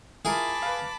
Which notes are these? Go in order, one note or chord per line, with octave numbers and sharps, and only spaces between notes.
E4 F4 G#4 A#4 A5 B5 D6
B4 F5